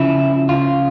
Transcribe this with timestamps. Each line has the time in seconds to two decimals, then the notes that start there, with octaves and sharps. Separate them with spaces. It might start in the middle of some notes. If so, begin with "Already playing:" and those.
Already playing: C#3 F3 E4
0.49 F4